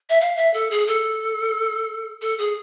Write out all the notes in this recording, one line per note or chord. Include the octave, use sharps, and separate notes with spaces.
E5
F5
E5
A4
G#4
A4
A4
G#4